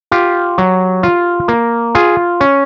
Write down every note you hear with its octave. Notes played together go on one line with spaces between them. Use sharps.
F4 G4
F#3
F4
A#3
F4 G#4
C#4